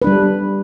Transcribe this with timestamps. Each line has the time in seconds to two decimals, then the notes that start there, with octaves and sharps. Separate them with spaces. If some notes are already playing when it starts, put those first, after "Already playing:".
0.02 B4
0.04 D4
0.07 G3